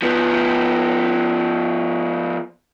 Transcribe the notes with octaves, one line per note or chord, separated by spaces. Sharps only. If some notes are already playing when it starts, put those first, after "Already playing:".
F3 B3